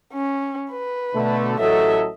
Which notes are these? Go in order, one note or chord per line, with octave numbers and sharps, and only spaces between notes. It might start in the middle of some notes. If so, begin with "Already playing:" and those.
C#4
B4
B2 D3 A3
A1 F#3 A4 D#5 E5